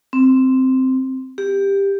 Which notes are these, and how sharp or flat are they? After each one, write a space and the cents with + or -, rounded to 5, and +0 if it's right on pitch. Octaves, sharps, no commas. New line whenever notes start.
C4 -5
G4 +15